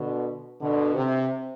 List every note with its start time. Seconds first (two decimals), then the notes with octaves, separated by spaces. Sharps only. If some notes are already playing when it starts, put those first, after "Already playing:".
Already playing: B2 D3
0.61 B2 D3
0.95 C3